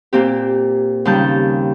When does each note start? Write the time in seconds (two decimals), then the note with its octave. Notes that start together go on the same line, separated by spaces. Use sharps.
0.13 A#2 A#3 C4 G4
1.05 D#2 C#3 G3 A5 G6